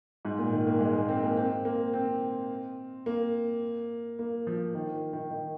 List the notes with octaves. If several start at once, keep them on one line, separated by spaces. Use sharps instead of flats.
G#2
A#2
D#3
A#3
G#3
A#3
C4
A#3
C4
A#3
C4
A#3
A#3
F3
D#3
D#3
D#3